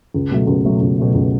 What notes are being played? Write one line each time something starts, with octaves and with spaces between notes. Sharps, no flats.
C#2
B2 F#3 A3
C#2
B2 F#3 A3
C#2
B2 F#3 A3
C#2